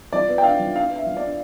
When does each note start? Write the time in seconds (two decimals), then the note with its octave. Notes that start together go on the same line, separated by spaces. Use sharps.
0.13 F3 D5
0.29 B3
0.38 G5
0.44 D4 F5
0.59 F3
0.75 D4 F5
0.90 B3
0.96 E5
1.06 F3
1.17 D4 D5